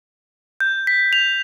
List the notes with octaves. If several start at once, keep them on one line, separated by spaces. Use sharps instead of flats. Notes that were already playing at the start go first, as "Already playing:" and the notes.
G6
B6
F7